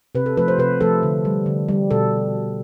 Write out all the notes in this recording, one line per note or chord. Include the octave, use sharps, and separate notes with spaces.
C3 B4
A4
F3 A3 B4
C5
C3 B4
F3 A3 A4
D3
G3
D3
G3
B2 A4